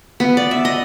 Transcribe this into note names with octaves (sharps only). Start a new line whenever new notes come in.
B3
D5
E5
D#5